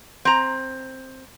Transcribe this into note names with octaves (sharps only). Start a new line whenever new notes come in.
C4 A#5